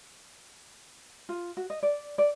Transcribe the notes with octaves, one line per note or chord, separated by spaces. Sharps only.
F4
F#4
D#5
D5
D5